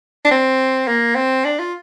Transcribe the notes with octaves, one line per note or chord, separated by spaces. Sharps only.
D4
C4
A#3
C4
D4
F4